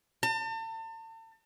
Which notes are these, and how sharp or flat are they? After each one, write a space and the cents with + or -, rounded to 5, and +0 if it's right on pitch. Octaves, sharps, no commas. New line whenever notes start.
A5 +40